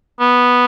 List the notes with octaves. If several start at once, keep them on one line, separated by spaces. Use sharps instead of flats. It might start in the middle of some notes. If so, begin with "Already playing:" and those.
B3